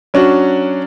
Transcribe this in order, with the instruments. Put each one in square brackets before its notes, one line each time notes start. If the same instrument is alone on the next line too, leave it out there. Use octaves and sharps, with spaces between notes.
[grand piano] F#3 C#4 D4 F#4